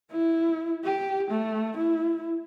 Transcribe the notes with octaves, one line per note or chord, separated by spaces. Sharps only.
E4
G4
A3
E4